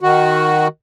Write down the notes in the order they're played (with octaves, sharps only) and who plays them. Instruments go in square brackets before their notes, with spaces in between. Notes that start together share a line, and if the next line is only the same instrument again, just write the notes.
[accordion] D#3 F#4